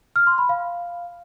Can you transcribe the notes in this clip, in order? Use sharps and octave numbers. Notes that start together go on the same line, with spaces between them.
F6
C6
B5
F5